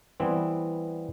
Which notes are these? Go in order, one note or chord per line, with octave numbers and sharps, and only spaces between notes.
E3 G3 B3 C4